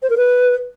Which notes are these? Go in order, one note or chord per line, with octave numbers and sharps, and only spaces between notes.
C5
A#4
B4